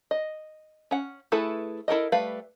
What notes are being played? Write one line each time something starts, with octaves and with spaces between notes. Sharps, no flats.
D#5
C#4 F#5
A3 E4 G#4 A4 B4
E4 A4 A#4 D#5
G3 A3 B4 F5